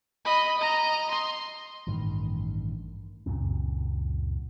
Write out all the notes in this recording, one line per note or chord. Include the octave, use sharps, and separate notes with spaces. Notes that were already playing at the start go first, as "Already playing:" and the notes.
D#5 B5
D#5 A#5
C6
A1 G2 D#3
C#2 F#2 A#2 C4